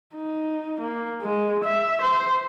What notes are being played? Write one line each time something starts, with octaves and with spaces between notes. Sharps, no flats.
D#4
A#3
G#3
E5
C5